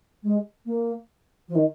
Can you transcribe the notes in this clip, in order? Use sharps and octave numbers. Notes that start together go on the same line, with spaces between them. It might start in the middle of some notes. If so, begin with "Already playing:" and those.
G#3
A#3
F3
D#3